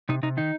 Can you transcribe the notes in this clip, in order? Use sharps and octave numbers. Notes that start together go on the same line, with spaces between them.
C3 D#4
C3 D#4
D#3 D#4